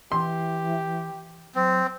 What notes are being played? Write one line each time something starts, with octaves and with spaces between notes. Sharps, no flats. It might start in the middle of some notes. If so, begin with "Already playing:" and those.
E3 G4 C6
F#3 C4